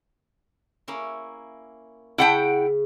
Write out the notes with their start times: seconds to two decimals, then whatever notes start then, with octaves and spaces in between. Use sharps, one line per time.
0.88 A#3 C#4 E4
2.18 C#3 E4 F#5 G5 A5